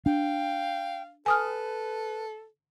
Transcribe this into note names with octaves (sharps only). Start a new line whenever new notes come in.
D4 F5 G5
A4 B4 G#5 D#6 F6